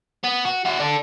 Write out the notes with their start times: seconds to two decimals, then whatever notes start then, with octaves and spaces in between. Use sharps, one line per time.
0.24 B3
0.45 F#4
0.65 E4 F#4
0.79 D4 A4